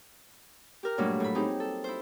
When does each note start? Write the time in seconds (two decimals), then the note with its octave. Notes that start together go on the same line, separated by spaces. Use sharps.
0.83 G4 A#4
0.98 G2 A#2 F#3 A3 D4
1.20 A2 B5
1.35 C4 D#4 G4 G#4
1.60 A4
1.84 E4 C5